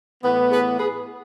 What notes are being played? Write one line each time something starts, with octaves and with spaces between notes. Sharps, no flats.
A2 E3 B3
G#4 B4
G#4 B4